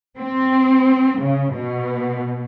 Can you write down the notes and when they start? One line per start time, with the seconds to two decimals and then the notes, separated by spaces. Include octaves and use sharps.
0.17 C4
1.21 C#3
1.54 B2